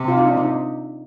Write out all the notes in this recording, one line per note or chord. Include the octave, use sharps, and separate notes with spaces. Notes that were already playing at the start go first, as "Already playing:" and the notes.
Already playing: C3
F4
D#4
D4
D#4